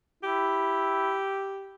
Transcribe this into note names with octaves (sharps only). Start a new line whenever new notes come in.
E4 G4